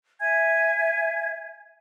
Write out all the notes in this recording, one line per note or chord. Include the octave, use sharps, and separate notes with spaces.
E5 G#5 G#6